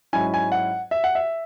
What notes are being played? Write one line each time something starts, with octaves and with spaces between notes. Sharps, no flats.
G#2 F#3 C#4 E4 G#5
G#5
F#5
E5
F#5
E5